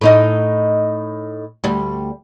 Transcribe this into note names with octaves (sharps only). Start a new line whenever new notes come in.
A2 D#4 D#5
D2 G3